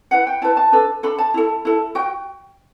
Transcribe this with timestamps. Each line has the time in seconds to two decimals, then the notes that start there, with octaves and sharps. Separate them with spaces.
0.11 E4 B4 F#5
0.27 G5
0.42 E4 B4 A5
0.57 A5
0.72 D4 A4 B4
1.03 D4 A4 B5
1.18 A5
1.34 E4 A4
1.65 E4 A4
1.95 F#4 G5